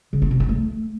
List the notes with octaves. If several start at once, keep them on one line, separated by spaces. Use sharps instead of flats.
C#3
E4
C3
E4
A3